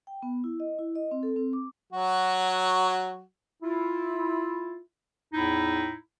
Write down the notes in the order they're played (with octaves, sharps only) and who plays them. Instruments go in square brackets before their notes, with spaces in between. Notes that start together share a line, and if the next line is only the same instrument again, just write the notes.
[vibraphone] G5
B3
E4
D#5
E4
D#5
C4
A4
C4
D6
[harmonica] F#3 F#4
[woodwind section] E4 F4
E2 A2 D#4 E4